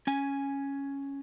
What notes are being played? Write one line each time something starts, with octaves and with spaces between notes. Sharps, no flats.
C#4 G#5